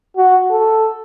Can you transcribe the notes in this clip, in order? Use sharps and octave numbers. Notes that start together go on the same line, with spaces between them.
F#4
A4